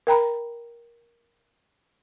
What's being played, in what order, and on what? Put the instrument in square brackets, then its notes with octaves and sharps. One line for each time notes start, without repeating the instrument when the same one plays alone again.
[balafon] A#4 G5 A#5 B5